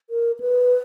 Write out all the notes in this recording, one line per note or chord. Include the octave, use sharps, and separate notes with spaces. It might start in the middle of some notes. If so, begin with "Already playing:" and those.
A#4
B4